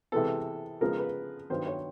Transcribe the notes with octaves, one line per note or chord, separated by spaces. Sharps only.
C3 E3 G#3 B3 A4
C#3 F3 G#3 B3 A#4
B4
G2 D#3 F#3 B3 C5
C#5